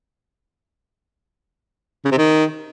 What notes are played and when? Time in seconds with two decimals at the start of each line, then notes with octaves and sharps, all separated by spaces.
2.05 C#3
2.11 C3
2.17 D#3